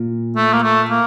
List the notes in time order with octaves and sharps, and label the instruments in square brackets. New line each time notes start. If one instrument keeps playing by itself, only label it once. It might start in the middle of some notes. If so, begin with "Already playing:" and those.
Already playing: [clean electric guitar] A#2
[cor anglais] A3
A#3
A3
A#3